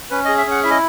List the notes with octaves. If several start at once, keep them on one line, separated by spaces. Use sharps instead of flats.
C#4 B4
G#4 D#5
E5
C#4 F#5
E4 E5
D#5